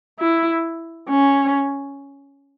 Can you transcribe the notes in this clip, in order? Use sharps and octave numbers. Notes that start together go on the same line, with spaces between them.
E4
C#4